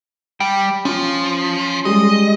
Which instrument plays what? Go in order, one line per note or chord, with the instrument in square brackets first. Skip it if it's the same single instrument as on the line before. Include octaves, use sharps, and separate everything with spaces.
[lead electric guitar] G3 [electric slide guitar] G5
[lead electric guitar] F3 [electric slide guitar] C#4 F4
[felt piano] G3 G#3 [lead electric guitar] D#5